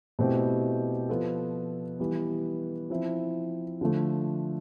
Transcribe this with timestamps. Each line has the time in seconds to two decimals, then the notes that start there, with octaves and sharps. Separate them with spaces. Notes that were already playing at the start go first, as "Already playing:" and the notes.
0.19 B2 A3 C4 E4 G4
1.09 F3 B3 F4 A4
1.99 E3 G3 B3
2.90 F3 C4 E4
3.81 D3 F3 A3